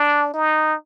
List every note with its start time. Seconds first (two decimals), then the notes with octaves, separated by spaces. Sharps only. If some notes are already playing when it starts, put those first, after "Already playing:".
Already playing: D4
0.34 D#4